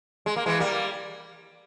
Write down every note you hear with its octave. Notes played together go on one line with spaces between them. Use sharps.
G#3
A#3
E3 G#3
G3 A#3